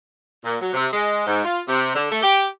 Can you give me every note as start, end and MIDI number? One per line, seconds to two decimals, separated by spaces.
0.45 0.56 46
0.61 0.73 54
0.73 0.86 48
0.93 1.23 56
1.26 1.43 44
1.44 1.61 65
1.67 1.93 48
1.94 2.10 50
2.11 2.23 57
2.23 2.46 67